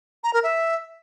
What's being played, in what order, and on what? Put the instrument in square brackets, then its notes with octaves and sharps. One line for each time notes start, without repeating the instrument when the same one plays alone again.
[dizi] A#5
A#4
E5